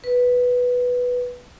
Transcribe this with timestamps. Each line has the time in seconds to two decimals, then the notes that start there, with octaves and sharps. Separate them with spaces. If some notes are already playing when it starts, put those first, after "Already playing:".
0.04 B4